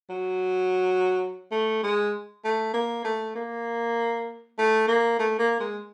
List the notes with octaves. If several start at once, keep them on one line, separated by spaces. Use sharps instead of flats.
F#3
A3
G#3
A3
A#3
A3
A#3
A3
A#3
A3
A#3
G#3